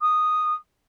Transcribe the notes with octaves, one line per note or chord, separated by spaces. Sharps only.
D#6